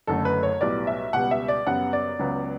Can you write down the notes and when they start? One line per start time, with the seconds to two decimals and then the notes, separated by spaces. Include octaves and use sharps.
0.07 F#1 F#2 D3 A3 A4
0.25 B4
0.43 C#5
0.61 B1 A2 G3 B3 D5
0.87 E5
1.13 C#2 B2 G3 B3 F#5
1.31 E5
1.48 D5
1.67 F#2 C#3 G3 B3 F#5
1.93 D5
2.19 C#2 C#3 F#3 B3